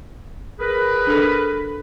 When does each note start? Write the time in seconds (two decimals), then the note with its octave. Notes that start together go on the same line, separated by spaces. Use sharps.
0.59 G#4 A#4 B4
1.07 D4 A4